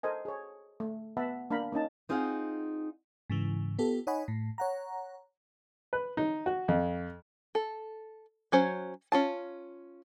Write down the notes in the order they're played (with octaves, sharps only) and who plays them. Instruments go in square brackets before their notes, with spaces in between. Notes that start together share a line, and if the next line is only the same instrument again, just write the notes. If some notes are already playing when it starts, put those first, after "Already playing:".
[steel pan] A4 A#4 C5 D#5 G#5
G#4 C#5
A3
B3 E5 F#5 A5 B5
A#3 D4 F5 A#5 B5
A#3 C#4 D#4 A5
[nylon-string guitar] C4 D#4 F4 G#4 F5 F#5
[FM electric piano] G#2 C#3 E3
B3 F4 G4 A4
D#4 C#5 D#5 F#5 G#5 B5
A2
C#5 F#5 A#5
[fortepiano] B4
D#4
F#4
F2
[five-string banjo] A4
F#3 C#4 C5
C#4 F4 A5